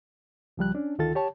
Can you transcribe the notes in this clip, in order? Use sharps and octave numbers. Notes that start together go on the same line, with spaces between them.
C#2 F3 G3 F#6
C#4 D4
D2 D#3 F4 A4 A6
G4 C#5 A5